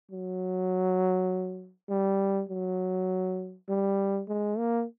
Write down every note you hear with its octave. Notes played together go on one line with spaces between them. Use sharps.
F#3
G3
F#3
G3
G#3
A#3